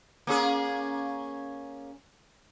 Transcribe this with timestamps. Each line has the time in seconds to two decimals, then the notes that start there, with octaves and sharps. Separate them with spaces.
0.27 A#3 C#4 G#4